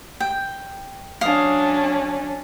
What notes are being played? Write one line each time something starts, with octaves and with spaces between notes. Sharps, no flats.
G5
F#3 C#4 D4 F5 D#6